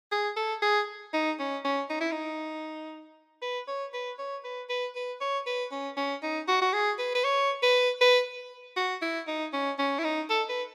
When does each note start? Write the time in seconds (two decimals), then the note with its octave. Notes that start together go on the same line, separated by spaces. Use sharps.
0.12 G#4
0.36 A4
0.62 G#4
1.13 D#4
1.39 C#4
1.64 C#4
1.90 D#4
2.01 E4
2.12 D#4
3.42 B4
3.68 C#5
3.94 B4
4.19 C#5
4.44 B4
4.70 B4
4.96 B4
5.21 C#5
5.47 B4
5.72 C#4
5.97 C#4
6.23 D#4
6.48 F#4
6.62 F#4
6.73 G#4
6.99 B4
7.15 B4
7.24 C#5
7.63 B4
8.01 B4
8.76 F#4
9.02 E4
9.28 D#4
9.53 C#4
9.79 C#4
9.99 E4
10.04 D#4
10.30 A4
10.49 B4